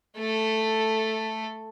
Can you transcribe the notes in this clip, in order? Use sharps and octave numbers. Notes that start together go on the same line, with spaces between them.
A3 A4